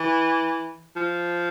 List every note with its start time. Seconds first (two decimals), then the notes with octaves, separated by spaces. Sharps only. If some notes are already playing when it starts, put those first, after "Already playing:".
Already playing: E3
0.96 F3